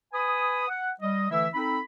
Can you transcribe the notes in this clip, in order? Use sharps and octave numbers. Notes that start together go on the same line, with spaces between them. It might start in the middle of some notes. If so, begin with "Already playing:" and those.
B4 G#5 B5 D#6
F#5
G3 D#5
D3 E3 A3 E4 E5
C4 D#4 A4 B5